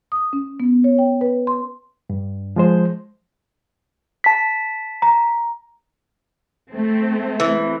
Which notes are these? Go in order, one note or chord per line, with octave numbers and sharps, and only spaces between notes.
D#6
C#4
B3
C#5
G5
B4
C6
G2
F3 G#3 C5
A5 B6
A#5
A3 C4
E3